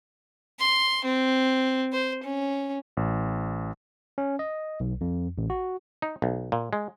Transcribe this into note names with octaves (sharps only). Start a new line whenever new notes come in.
C6
C4
C5
C#4
A1
C#4
D#5
B1
F2
A1
F#4
D#4
B1
A#2
G#3